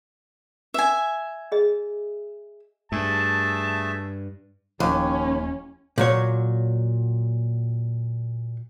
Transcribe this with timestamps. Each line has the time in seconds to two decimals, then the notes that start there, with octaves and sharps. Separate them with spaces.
0.74 E5 G#5
1.52 G#4 D#5
2.92 G2 A3 G#4 E5 A5
4.80 D#1 D#2 F3 C#4
5.98 A#2 F#3 C#5